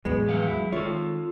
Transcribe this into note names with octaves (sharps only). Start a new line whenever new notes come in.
E2 A2 F#3 G#3 B3
E3 F5 F#5
F#3 E4
D#3 G#3 F4 A4 C#5